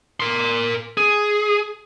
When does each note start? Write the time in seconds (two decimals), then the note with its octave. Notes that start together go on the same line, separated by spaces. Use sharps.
0.20 A#4 C6
0.97 G#4